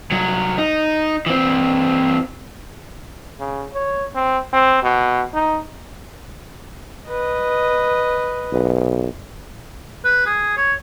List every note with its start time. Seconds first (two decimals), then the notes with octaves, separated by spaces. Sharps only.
0.11 C2 F#3
0.58 D#4
1.26 E3 C4
3.40 C#3
3.74 C#5
4.15 C4
4.53 C4
4.83 B2
5.34 D#4
7.09 B4 D#5
8.52 B1
10.05 B4
10.26 G#4
10.57 C#5